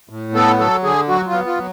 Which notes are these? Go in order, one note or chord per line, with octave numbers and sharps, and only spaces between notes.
A2
B3 A4
F#3 A4
D3 G#4
F#3 F#4
F4
B3
F4
F#3